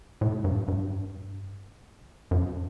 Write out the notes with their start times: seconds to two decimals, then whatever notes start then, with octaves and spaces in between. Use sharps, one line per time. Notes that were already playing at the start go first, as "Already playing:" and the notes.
0.21 A2
0.44 G2
0.68 G2
2.31 F#2